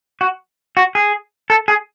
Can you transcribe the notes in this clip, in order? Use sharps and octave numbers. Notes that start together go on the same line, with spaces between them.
F#4
F#4
G#4
A4
G#4